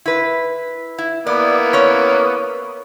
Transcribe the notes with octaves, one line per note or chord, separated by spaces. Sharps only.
E4 B4
E4
A#3 B3 E4 D5
C#4 C#5